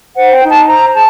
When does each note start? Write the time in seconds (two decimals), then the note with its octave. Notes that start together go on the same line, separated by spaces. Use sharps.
0.16 C5 F#5
0.33 G5
0.43 D#4
0.51 A5
0.68 C5 A#5
0.94 G#4 A5